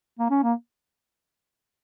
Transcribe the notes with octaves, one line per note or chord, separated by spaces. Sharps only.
A#3
C#4
A#3